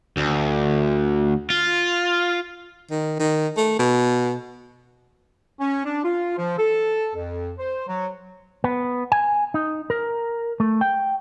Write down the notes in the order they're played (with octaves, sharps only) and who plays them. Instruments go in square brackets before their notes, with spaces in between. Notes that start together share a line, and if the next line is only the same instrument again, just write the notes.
[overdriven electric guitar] D2
F4
[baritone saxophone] D#3
D#3
A3
B2
[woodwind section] C#4
D4
F4
F3
A4
F2
C5
F#3
[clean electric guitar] B3
G#5
D#4
A#4
A3
G5